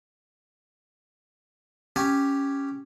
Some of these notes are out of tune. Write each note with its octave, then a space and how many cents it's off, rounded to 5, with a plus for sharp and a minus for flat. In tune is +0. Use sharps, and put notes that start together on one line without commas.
C#4 +0 G4 +0 G#5 +0